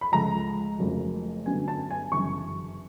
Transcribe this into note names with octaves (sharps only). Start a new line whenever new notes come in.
B5
C#2 C#3 F3 A3 A#5
F1 F2 C#3 F#3 A#3
G2 D3 F#3 B3 G#5
A5
G#5
G1 F#2 C#3 E3 C#6